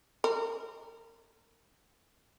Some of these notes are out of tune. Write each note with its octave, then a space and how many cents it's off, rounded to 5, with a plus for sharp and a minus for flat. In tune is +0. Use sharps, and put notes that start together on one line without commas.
A#4 -30